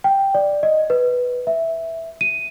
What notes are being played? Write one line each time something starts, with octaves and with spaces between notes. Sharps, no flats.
G5
D5
D#5
B4
E5
D#7